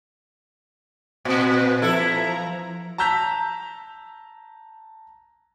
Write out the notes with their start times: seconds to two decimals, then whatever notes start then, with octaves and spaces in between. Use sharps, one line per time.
1.25 A#2 C4 B4
1.82 F3 E4 A4 A#5
2.98 A5 A#5 E6 G6 B6 F7